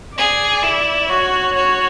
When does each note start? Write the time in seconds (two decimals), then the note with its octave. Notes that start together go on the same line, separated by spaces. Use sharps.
0.18 G#4 D5
0.63 E4
1.09 F#4 C#5
1.54 F#4 C#5